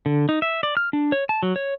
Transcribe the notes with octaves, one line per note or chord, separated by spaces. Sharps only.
D3
D#4
E5
D5
F6
D4
C#5
A5
F#3
C#5